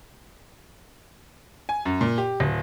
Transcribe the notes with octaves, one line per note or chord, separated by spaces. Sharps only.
G#5
F#2
A#2
G4
D1